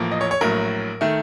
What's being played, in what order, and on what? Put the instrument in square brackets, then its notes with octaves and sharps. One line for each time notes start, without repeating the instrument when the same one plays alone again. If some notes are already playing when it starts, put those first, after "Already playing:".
Already playing: [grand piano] A1 A2 F3 A#3
D#5
C#5
C#5
A#1 A2 F#3 A#4
D#3 A3